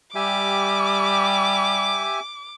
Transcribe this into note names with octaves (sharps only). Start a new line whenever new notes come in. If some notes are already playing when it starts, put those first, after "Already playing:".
G3 G4 E5 G#5 D6